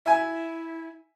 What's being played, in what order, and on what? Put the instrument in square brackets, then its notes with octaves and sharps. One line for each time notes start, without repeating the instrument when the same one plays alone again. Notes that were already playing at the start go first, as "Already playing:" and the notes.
[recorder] E4 [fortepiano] E5 G#5